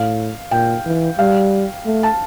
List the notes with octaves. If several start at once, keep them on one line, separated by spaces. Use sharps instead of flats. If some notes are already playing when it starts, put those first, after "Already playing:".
Already playing: A2 F5
A#2 G5
E3
G3 F5
A3
A5